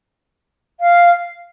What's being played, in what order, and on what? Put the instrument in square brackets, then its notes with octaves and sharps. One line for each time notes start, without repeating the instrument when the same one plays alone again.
[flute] F5